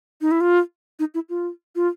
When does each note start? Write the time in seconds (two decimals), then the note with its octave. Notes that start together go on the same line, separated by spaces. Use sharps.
0.21 D#4
0.31 E4
0.41 F4
0.99 D#4
1.14 E4
1.29 F4
1.75 F4